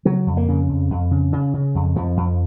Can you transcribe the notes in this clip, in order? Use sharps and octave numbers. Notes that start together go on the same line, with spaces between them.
C#3 F#3
F2
A#3
C#3
F2
F2
C#3
C#3
C#3
F2
F2 F3
F2